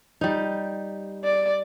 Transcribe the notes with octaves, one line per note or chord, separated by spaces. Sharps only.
G3 D#4
D5